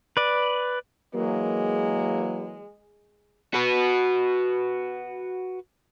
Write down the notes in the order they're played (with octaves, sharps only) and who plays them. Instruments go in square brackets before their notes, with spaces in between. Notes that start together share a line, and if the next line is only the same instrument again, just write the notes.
[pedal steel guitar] B4 D5
[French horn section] E3 F#3 A#3 [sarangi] G#3
[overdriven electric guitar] F#4 B4